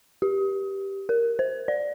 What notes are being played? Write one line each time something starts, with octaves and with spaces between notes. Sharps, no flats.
G4
A#4
C5
D5